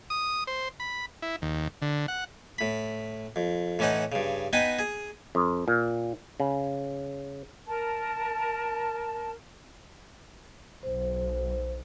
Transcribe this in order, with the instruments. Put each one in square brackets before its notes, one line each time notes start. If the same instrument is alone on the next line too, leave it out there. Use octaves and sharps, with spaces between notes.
[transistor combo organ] D#6
C5
B5
E4
D#2
D3
F#5
[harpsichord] A2 B5
F2
A2 E3 C#4 D#4 F#5
G2 C#3
B3 D#4 B4 D#5 G5 G#5
G#4
[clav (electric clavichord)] F2
A#2
C#3
[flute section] A#4 A5
[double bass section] B1 [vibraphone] C5